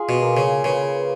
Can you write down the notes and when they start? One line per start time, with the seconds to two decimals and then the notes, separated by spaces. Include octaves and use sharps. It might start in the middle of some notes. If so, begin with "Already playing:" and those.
Already playing: F4 G#4
0.09 B2
0.22 A#3
0.37 C#3
0.64 C#3 B4